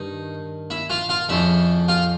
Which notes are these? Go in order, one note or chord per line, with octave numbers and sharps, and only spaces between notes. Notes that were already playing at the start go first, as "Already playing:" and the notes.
Already playing: G2 D#3 D#4
E4 E5
F4 F5
F4 F5
F2 C#3 F3 E4 E5
F4 F5